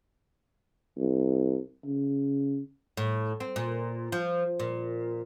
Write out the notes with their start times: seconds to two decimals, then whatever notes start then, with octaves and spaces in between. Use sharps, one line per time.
0.98 C2
1.85 C#3
2.97 A2
3.40 C4
3.56 A#2
4.12 F3
4.60 A#2